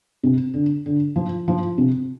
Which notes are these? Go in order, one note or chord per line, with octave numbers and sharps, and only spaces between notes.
C3
D3
D3
F3
F3
C3